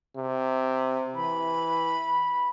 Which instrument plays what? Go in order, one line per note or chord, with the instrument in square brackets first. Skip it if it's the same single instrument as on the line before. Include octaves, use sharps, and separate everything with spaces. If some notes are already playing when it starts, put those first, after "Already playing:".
[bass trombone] C3
[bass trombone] E3 [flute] B5